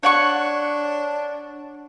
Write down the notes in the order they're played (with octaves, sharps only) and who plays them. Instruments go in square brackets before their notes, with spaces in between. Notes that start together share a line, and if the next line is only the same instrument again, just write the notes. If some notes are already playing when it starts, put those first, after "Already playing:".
[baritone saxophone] D4 [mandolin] C#5 F#5 C#6